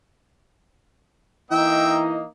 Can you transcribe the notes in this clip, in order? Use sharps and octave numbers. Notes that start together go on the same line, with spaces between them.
E3 A#3 D#4 D#5 E5 G5